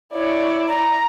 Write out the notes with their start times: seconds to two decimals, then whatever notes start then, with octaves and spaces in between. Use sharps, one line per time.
0.13 E4 C#5 D5
0.68 A#5